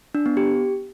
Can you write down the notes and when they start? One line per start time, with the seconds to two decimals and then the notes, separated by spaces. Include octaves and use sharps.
0.15 D4
0.26 B3
0.37 G4